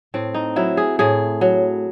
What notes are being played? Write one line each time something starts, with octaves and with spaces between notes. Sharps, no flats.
A2 C4
D#4
F#3 E4
G#4
A2 G#4
F#3